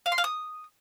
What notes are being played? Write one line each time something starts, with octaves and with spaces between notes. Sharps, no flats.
F5
C6
F5
D#6